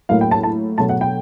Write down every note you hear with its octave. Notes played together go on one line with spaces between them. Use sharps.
A2 F#3 A#3 F5
G5
A5
A5
B2 F#3 A3 A5
F#5
G5